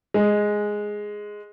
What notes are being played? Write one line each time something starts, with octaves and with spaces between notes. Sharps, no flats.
G#3